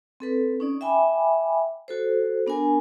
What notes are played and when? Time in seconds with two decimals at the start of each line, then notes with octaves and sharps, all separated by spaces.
0.20 C4 A4 B4
0.60 C#4 D#4 D5
0.81 E5 G5 G#5 B5 D6
1.88 F#4 A4 C5
2.47 B3 D4 A#4 G#5